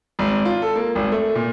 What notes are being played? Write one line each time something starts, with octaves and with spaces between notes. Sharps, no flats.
G#1
F4
A4
A#3
G#1
A3
A#2